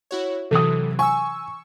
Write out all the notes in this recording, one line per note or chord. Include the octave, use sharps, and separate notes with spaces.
E4 F#4 C#5
C3 E3 F#3 A4 D#6
G#5 C#6 E6